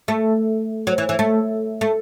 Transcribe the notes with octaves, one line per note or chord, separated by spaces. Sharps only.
A3
F#3
E3
E3
A3
A3